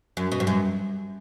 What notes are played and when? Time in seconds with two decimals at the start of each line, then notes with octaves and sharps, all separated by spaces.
0.17 F#2
0.32 B2
0.40 G2
0.47 F#2